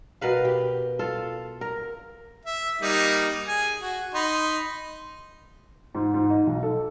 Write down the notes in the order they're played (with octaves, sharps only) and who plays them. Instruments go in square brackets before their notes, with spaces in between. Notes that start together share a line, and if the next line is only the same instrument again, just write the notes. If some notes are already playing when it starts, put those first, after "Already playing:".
[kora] B2 A#4 B4 F5
G4
F4 A4 F5
A#4
[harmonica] E5
G3 A#3 D#4
G#4 G#5
F#4
D#4 B5 C6
[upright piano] G#2
G#2
D#4
B1
A4